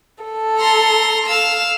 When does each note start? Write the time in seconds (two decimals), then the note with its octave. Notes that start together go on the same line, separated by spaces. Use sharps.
0.23 A4
0.58 A#5 C6
1.26 F5 E6